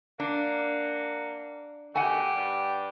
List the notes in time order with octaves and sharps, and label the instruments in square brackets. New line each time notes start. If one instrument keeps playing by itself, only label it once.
[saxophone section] A#3 F#5 [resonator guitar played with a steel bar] D4
[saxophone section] B2 D#3 A3 [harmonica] G4 [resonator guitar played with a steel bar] F#5 G#5
[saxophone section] G2 G3